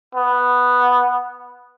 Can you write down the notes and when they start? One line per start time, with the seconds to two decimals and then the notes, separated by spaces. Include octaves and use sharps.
0.15 B3